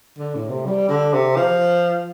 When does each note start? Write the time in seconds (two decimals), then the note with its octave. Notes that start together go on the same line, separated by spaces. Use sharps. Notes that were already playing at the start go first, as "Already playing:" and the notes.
0.19 D3
0.35 A2
0.50 C3
0.66 G3
0.89 D3
1.13 C3
1.36 F3